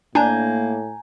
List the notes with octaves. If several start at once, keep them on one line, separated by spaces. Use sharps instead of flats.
A2 A#3 D4 G#5 A#5 G6